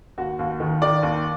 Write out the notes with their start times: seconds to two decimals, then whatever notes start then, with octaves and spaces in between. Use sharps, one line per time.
0.18 D#2 F#4
0.39 D#2
0.60 D#3
0.82 D#3 D5
1.03 D#2